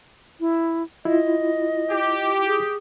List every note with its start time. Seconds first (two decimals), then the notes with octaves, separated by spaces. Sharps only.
0.40 E4
1.05 E4 F4 D#5
1.91 G4
2.47 G#4